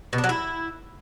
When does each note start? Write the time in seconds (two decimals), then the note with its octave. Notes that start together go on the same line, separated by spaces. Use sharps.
0.13 B2
0.18 D4
0.24 F#3
0.29 E4